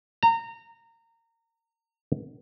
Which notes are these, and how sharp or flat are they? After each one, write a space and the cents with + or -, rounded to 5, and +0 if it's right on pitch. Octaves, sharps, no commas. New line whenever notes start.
A#5 -25